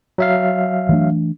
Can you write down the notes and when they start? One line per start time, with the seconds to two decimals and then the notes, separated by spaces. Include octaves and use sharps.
0.18 F#3 E5 F5
0.89 E3 A3 D4